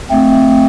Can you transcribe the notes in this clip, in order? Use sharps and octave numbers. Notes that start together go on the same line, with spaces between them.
A3 C4